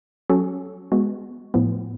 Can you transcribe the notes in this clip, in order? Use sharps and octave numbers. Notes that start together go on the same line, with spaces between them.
F#3 C#4 F#4 A4
G#3 B3 F#4
A2 F3 B3